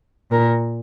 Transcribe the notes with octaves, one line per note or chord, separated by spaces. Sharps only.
A#2 A#4